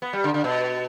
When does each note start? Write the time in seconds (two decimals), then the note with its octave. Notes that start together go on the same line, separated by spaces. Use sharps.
0.02 B3
0.13 G3
0.24 D3
0.34 D3
0.44 B2